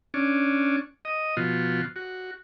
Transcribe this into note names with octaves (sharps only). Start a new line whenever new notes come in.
C#4 D4
D#5
B2 F3 F4 F#4
F#4